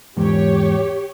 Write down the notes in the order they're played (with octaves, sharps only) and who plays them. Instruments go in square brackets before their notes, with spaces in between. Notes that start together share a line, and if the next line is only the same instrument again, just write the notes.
[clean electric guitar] E2 G#2 [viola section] G4 C#5